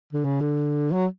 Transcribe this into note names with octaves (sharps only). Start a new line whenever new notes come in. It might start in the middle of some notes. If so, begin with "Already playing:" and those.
D3
C#3
D3
F#3